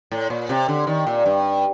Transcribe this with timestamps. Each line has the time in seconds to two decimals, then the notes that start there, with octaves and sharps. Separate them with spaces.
0.12 A2
0.30 A#2
0.49 C3
0.68 D3
0.87 D#3
1.07 A#2
1.26 G2